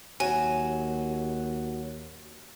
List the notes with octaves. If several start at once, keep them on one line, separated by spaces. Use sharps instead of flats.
D#2 F#3 G#5